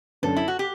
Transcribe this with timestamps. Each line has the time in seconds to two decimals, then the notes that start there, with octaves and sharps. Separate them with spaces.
0.23 F#2 D3 F#3 A4
0.36 E4
0.48 F#4
0.59 G4